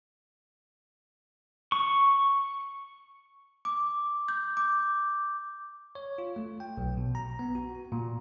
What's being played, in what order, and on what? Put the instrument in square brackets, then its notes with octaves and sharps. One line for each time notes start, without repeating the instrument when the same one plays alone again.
[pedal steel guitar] C#6
[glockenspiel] D6
G6
D6
[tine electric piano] C#5
F4
A3
G5
B1
B2
A#5
B3
F#4
A#2